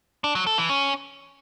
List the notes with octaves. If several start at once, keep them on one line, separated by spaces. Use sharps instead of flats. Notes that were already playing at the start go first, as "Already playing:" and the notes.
D4
F#3
A4
E3
C#4